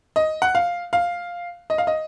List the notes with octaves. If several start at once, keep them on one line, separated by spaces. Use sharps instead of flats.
D#5
F#5
F5
F5
D#5
F5
D#5